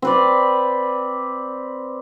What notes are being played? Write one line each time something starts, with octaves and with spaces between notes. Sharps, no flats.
C4 B4 D5